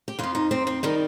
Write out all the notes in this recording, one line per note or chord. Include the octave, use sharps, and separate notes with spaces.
G4
F2 F3 F4
D#4
C4
C4
D#3 G3 D#4